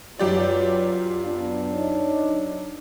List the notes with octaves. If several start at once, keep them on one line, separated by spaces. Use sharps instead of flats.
F#2 F#3 F4 G4 B4 C#5 D5
B3 D4 F4
D#4 C#5